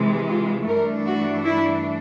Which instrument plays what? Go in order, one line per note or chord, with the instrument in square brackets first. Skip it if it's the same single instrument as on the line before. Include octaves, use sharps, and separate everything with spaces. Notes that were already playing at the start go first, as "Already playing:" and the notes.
Already playing: [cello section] C3 E3 G#3
F4
G2 E3 A3 D4 A#4
F#4
E4